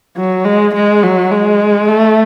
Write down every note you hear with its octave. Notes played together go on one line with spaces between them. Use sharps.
F#3
G#3
G#3
F#3
G#3
A3